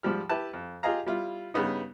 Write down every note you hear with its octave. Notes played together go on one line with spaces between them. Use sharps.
G#2 F3 G3 F6
E4 G4 B4 A5
F2
F4 G4 G#4 D#5 F5 A#5
G3 E4 F4
G2 C#3 B3 D#4